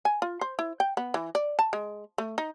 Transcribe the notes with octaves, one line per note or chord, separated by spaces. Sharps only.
G#5
F4
C5
E4
G5
B3
E3
D5
A5
G#3
A3
D#4